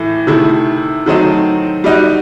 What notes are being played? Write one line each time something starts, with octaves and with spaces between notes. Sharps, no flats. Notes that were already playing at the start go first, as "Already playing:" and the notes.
Already playing: A2 E3 A3
C3 D#3 A3 E4
D#3 F#3 A3 C4 D#4
G3 D#4 F#4